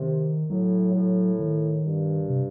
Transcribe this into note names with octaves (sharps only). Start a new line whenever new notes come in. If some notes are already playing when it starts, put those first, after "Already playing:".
Already playing: C3 D#3
A2 F#3
A2
D#3
G2
C3